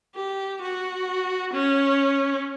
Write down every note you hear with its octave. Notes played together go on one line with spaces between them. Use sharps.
G4
F#4
C#4